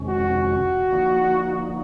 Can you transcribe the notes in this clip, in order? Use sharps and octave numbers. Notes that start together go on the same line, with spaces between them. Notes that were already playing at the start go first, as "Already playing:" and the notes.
Already playing: F2 C3 D#3 G#3 C#4
F#4
D3 F3 A#3 D#4